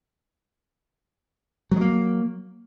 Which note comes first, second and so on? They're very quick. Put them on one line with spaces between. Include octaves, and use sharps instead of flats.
F#3 G#3 A#3